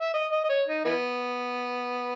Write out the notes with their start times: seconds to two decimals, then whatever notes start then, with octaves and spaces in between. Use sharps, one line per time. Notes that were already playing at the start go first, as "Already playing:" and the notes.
0.01 E5
0.14 D#5
0.32 D#5
0.44 D#5
0.49 C#5
0.68 D#4
0.85 E3 B3